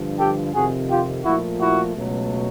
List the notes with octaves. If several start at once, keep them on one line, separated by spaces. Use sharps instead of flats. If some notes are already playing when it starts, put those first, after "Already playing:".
Already playing: G2 D3 F3
G4 A4
F2 C3 D#3 F#4 G#4
F4 G4
A#2 F3 A3 E4 F#4
E4 F#4
C#2 B2 F#3 A3